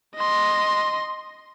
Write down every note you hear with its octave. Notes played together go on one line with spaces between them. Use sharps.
D#5 C6